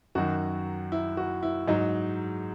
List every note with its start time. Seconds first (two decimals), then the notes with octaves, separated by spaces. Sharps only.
0.15 F#2 D#3 F#3 F#4
0.92 E4
1.17 F#4
1.43 E4
1.68 G#2 F#3 D#4